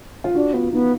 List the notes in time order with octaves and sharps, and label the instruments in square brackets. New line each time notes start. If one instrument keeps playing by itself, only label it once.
[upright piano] F4
[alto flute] D4 [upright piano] F#4
[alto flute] B3 [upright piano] F4
[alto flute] B3 [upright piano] D#4